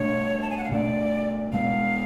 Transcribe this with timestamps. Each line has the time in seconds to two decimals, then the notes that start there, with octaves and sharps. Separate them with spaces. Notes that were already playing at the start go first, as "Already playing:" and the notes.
Already playing: B2 A3 D4 C#5
0.42 A5
0.50 G#5
0.58 F#5
0.64 F5
0.72 B2 A3 D4 D5
1.53 B2 G#3 B3 F5